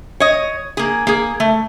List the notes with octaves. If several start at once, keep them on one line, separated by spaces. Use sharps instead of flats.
C#5 D#5
A#3 G#4
A#3 G#4
A3